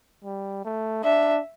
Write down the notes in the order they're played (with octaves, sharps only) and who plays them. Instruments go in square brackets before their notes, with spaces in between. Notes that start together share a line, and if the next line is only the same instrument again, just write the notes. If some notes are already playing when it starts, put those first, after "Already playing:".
[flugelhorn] G3
A3
[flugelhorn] D4 [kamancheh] E5